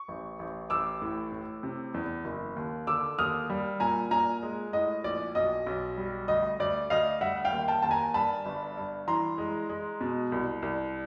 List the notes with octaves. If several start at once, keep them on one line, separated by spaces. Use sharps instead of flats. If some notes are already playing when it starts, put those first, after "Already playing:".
Already playing: C#6
A1
A1
A1 D6 E6
A2
A2
C3
E2
F#1
D#2
D3 D6 E6
D#2 D#6 F6
G3
A#2 G#5 A#5
A#2 G#5 A#5
G#3
A2 D#5
A#1 D5
B1 D#5
B1
G3
D2 D#5
D2 D5
D2 D#5 F5
G3 E5 F#5
F5 G5
D#2
G5 A5
D#2 A5
G#5 A#5
G2 A5 B5
G1
G2
E3 A#5 C6
G#3
G#3
B2
C2
C2